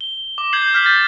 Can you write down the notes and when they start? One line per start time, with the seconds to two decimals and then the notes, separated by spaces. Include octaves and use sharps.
0.01 G7
0.38 D6
0.53 G6 G#6 C7 F#7
0.74 F6 G6 B6
0.86 A6